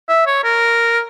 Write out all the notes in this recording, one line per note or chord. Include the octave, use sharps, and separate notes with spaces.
E5
C#5
A#4